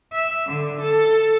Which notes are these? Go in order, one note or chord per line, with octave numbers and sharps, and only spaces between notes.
E5
D3
A4